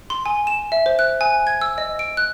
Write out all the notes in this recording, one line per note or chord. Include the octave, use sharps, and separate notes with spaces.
C6
G#5
E7
E5
C5
F#6
G#5
G#6
E6
D#5
D7
F#6